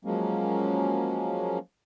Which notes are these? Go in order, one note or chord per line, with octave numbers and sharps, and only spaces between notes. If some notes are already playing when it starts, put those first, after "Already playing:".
F3 F#3 G#3 A#3 C#4